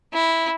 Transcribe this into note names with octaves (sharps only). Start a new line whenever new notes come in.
E4